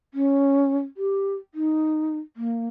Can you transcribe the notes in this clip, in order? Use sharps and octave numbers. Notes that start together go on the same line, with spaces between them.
C#4
G4
D#4
A#3